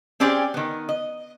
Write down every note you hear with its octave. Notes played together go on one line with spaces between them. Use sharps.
C4 C#4 G4 G#4 D5
D#3 B3
D#5